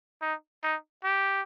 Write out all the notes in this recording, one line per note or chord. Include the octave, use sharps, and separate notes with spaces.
D#4
D#4
G4